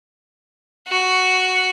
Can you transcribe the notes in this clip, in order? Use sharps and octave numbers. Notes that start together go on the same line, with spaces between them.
F#4